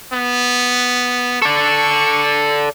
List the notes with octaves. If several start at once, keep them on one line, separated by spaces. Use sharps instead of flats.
B3
A4 D5 C#6